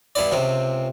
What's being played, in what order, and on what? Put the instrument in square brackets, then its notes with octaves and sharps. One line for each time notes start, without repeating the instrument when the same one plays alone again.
[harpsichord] G2 B3 E4 D5
C#2 C3 C4